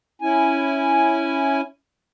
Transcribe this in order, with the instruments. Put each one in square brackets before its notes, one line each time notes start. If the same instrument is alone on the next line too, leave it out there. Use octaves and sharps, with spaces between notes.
[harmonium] C#4 E4 G#5